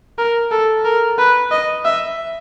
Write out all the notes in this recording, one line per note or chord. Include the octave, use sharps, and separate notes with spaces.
A#4
A4
A#4
B4
D#5
E5